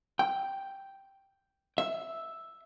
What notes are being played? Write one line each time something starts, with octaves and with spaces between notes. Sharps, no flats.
G5
E5